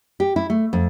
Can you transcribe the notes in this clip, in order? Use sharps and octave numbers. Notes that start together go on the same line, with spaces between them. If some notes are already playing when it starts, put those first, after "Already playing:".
G4
E4
A3
F2